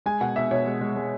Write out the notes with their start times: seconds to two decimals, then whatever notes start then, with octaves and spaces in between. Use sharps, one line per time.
0.06 G#3 G#5
0.21 B2 F#5
0.36 B2 E5
0.51 B2 C#5
0.66 G#3
0.81 G#3
0.96 G#3